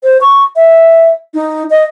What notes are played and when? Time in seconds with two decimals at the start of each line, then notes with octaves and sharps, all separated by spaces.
0.03 C5
0.21 C#6
0.56 E5
1.34 D#4
1.70 D#5